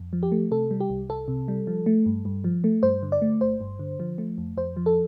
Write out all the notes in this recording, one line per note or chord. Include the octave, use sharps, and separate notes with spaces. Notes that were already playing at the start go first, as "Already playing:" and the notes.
Already playing: F2
F3
G4
A3
C3 A4
G3
G4
C2
C2 A4
C3
G3
F3
A3
G2
G2
F3
A3
G2 C5
D3
D5
A3
G1 C5
G2
D3
F3
A3
F2
F2 C5
F3
A4